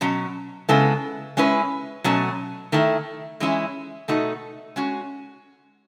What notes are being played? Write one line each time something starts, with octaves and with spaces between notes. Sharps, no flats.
B2 F#3 C#4
C#3 G#3 B3 E4 A4
G#3 C#4 E4 B4
B2 F#3 A3 C#4
D#3 A3 E4
E3 G#3 C#4 E4
B2 A3 D#4 F#4
G#3 C#4 F#4